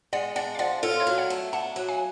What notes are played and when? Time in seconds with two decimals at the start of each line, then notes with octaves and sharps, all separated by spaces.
0.13 G#3 D5 F#5
0.36 D4 D5 F#5
0.55 F5
0.59 F3 D5 F#5
0.83 F4 A4 C#5
1.00 C#5 F5
1.07 F#3
1.18 D5 F#5
1.30 A3
1.53 D4 F#5 A5
1.76 F#3
1.88 F5 G#5